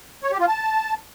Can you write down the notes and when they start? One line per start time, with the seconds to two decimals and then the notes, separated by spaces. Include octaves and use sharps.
0.23 C#5
0.31 G4
0.40 F4
0.48 A5